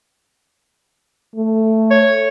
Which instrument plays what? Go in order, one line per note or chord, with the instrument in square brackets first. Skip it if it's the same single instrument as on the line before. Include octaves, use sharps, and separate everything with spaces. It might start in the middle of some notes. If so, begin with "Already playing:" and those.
[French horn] A3
[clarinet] C#5